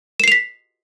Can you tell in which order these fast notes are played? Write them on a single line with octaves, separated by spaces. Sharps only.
E7 C7 F7 B6